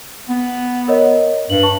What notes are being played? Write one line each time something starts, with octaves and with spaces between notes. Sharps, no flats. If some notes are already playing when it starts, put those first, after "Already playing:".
B3
A#4 C#5 D#5
G2 F#7
A5 C#6